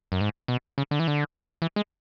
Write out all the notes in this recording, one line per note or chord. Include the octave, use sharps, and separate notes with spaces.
F#2
G#2
B2
C#3
D3
E3
D3
E3
G#3